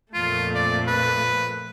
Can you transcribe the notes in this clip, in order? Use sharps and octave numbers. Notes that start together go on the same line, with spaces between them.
F2 A#2 A3 F4
D5
B4